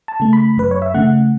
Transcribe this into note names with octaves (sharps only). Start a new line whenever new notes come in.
A5
C#3 A3
B5
F#2 B4
C#5
E5
C#3 A3 F#5